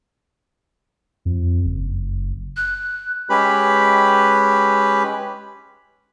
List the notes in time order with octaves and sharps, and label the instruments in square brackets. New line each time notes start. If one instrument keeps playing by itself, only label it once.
[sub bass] F2
F#1
[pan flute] F#6
[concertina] G#3 C#4 G4 B4 B5